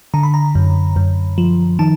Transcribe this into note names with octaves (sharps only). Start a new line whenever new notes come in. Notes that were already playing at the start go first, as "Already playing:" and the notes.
D3 A#5
B5
A#5
F#2
F#2
F3
D#3 A5